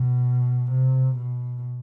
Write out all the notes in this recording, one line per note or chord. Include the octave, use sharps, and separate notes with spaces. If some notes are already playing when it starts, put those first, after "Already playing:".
Already playing: B2
C3
B2